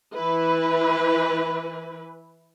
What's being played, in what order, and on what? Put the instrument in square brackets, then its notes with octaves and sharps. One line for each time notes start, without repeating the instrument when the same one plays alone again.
[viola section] E3 E4 B4